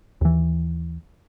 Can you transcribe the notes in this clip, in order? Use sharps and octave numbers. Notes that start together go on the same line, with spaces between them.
D#2 E3